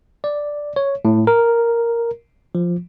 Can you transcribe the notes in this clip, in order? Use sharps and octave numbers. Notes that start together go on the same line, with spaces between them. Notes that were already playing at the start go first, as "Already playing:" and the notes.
D5
C#5
A2
A#4
F3